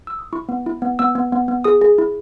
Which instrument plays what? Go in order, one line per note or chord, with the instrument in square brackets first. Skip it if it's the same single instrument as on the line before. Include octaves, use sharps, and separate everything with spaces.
[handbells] E6
D#6
E4 C#6
B3
E4
B3
B3 E6
B3
B3
B3
G#4 D#6
G#4
E4